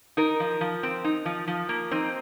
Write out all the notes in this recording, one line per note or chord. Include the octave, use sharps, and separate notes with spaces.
D#4 A#4
F3
F3
C4
D#4
F3
F3
A#3
C4 D#4